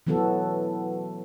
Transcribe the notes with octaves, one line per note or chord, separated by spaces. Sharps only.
E3 F#3 B3 F#4 A4